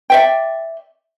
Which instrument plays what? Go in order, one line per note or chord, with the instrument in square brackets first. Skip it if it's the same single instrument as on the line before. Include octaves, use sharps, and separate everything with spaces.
[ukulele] D5 E5 G5